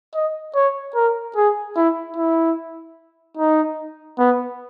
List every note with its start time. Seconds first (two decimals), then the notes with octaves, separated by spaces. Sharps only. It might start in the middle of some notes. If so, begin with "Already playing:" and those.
0.14 D#5
0.55 C#5
0.95 A#4
1.36 G#4
1.76 E4
2.16 E4
3.37 D#4
4.18 B3